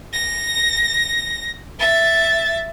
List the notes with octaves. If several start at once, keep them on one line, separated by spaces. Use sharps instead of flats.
A#6
E5 A6